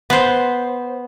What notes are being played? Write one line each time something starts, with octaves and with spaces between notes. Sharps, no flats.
B3 C5